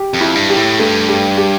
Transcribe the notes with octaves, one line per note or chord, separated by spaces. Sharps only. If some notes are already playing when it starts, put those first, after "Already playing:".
Already playing: G4
F2
E4
G2
G4
A2
G2 A3
G4
G4